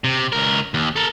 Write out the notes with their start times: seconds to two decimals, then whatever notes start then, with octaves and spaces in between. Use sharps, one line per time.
0.04 C3
0.32 C#2 A#4
0.74 D#2
0.96 A4 A#4